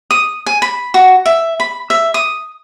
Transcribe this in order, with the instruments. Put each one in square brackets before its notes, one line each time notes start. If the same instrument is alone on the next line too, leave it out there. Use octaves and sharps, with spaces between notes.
[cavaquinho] D#6
G#5
B5
F#4
E5
B5
E5
D#6